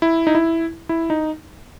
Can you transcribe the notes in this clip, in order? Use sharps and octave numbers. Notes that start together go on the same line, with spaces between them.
E4
D#4
E4
E4
D#4